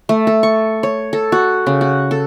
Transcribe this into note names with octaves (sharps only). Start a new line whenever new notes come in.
A3
A4
C#6
C#5
A4
F#4
C#3
F#4
A4